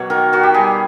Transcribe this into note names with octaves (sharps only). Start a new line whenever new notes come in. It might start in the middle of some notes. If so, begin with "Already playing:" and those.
Already playing: B2 F#3 A#3 C#5 F#5
D#3 A#4
D#3 F#4
G4
G3 G#4